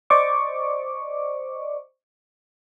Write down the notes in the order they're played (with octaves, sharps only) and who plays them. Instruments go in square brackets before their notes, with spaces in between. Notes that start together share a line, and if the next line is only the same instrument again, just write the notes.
[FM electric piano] C5 D5 D#5 C#6 D6